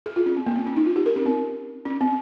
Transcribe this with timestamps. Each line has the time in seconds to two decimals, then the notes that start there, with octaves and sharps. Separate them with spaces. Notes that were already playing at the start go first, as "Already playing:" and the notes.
0.06 G#4
0.16 F4
0.26 C#4
0.37 C4
0.46 A#3
0.56 C4
0.67 C#4
0.76 D#4
0.86 F4
0.96 G4
1.06 A#4
1.16 C#4
1.26 C4
1.85 C#4
2.01 C4